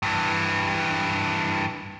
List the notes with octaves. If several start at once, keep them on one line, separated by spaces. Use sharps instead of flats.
G2 E3